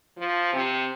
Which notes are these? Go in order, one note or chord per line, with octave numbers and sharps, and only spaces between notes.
F3
C3